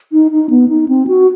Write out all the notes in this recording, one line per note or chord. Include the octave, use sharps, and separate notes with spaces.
D#4
D#4
B3
D#4
C4
F#4